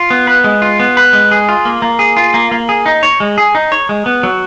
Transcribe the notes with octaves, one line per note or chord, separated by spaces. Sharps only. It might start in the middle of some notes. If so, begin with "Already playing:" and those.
Already playing: F4
B3
B4
G#3
F4
B3
B4
G#3
G#4
F4
A#3
A#3
G#4
F4
A#3
A#3
G#4
D#4
C#5
G#3
G#4
D#4
C#5
G#3
B3
F#3